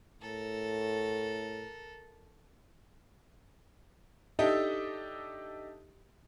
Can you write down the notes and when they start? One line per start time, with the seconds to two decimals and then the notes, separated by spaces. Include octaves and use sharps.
0.22 A2 A4 A#4
4.39 D4 D#4 G4 A4 D#5 E5